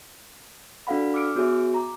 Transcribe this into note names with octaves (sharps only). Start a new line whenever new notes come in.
D4 F#4 A4 F5 F#5 B5
D6 E6 F6 C#7 D7
B3 F#4 G#4 C#5 E5
A#5 D6